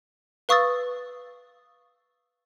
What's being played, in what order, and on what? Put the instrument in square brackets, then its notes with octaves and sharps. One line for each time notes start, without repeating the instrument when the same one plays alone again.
[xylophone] B4 F5 C#6 D#6 E6 A6